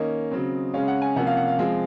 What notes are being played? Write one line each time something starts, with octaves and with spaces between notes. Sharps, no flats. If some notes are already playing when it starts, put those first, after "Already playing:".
Already playing: D#3 A#3 C#4 D#5
C#3 F#3 C4
C#3 G#3 C#4 F5
F#5
G#5
C3 F3 A#3 C#4 F#5
F5
F#5
F5
F3 G#3 C4